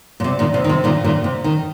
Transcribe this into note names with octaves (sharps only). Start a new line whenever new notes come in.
A#2
C3
A#2 D#3
C3
D#3
C3
A#2 D#3
A#2 D#3
C3
D#3